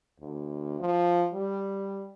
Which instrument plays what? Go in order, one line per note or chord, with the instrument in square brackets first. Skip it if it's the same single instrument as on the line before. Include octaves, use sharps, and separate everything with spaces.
[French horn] D2
F3
G3